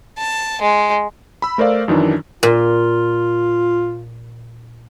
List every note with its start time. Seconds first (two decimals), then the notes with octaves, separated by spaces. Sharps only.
0.18 A5
0.62 G#3
1.42 B5 E6
1.58 A3 A#4 C5 D5 F5
1.88 F#2 D#3 E3 D4
2.43 A#2 F4